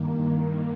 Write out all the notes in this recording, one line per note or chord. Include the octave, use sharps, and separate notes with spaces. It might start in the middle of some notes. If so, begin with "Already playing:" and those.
Already playing: G2 D#3 A#3